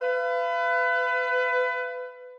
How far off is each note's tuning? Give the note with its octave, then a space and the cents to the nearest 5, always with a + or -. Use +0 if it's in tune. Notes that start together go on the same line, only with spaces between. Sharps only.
B4 +25 F5 -35